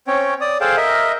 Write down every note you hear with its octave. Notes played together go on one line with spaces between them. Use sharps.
C4 C#4 C#5 G5
D5 D#6
G#4 A4 C5 F5 G5 A5
A#4 D#5 E5